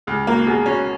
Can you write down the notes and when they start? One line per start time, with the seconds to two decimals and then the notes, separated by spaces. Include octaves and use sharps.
0.07 C#2 G#4
0.27 A#3 F#4
0.47 B2 G#4
0.66 C#4 F#4